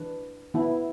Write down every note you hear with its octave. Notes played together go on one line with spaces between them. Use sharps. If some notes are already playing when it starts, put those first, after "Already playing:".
Already playing: E3 D4 B4
E3 B3 E4